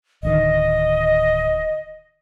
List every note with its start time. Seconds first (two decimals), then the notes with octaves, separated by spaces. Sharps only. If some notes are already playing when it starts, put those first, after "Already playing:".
0.23 D1 D2 D#3 D#5